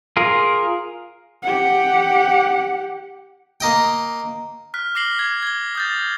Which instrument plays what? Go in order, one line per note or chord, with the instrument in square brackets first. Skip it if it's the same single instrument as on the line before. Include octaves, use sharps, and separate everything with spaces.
[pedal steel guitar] F4 G#4 A#4
[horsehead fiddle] G4 F#5
[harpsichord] A#3 D#5 G5
[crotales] F6 F#6 B6
D6 F6 A#6 C7 F#7 G7
G#6
G#6 G7
D#6 G6 A6